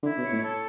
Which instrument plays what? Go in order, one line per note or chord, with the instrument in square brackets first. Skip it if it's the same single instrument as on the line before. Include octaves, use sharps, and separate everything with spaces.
[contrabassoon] D3 [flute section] E4
[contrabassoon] B2
[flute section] C#5
[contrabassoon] A2
[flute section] A4